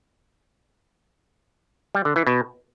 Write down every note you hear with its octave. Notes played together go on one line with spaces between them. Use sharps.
G3
D3
E3
B2